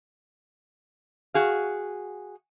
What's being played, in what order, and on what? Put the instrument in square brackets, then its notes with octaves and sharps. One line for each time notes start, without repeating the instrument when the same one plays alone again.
[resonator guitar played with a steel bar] F#4 G#4 F5